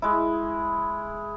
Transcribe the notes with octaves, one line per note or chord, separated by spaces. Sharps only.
G#3 E4